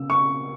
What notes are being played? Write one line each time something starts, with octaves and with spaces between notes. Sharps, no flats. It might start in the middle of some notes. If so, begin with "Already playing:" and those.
Already playing: C#3 B3 E6
C#6